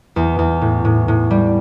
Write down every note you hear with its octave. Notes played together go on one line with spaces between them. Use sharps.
E2
E2
A2
A2
A2
G3